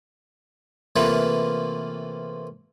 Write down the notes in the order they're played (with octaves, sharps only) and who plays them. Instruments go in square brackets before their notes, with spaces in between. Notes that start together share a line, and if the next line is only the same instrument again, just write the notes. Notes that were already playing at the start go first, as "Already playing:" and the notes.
[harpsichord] C3 E3 A3 A#3 F4 B4